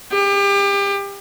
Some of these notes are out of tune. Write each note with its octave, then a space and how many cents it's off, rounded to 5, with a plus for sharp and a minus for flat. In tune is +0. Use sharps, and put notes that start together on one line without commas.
G4 +30